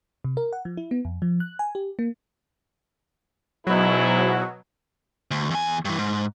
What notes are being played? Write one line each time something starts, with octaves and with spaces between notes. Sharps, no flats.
C3
A#4
F#5
F3
E4
B3
F2
F3
F#6
G#5
G4
A#3
G#2 B2 F#3 E4
D2
E2 G#5
G2 E3
G#2